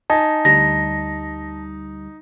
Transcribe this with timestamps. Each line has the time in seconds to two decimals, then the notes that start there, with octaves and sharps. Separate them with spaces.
0.10 D#4 G#5 A5
0.45 D2 G3 A#6